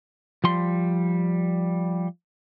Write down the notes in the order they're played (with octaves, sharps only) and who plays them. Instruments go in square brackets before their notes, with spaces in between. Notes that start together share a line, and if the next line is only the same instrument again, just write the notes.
[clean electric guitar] F3 G3 C6